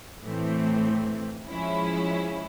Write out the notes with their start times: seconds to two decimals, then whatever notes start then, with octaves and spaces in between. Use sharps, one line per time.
0.23 A2 E3 A3 C4
1.49 F3 G#3 C#4 E4